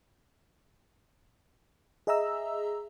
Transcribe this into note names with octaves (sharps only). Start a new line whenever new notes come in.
G#4 D#5 E5 A#5 E6